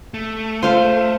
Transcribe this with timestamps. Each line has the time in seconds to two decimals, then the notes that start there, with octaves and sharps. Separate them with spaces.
0.14 A3
0.63 F4 A4 C5 F5